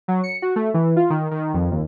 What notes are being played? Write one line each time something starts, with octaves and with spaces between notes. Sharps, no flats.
F#3
C#7
F#4
A3
E3
F4
D#3
D#3
F2
D#2